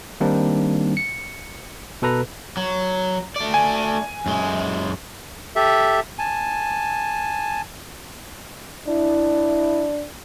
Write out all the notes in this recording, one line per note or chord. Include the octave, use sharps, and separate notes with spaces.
D#3 G3 A#3 C4 D4 D#4
C#7
B2 A4 B4 A#5
F#3
A3 D5
G#5
F#2 G#3
G4 A4 E5
G#5 A5
D4 E4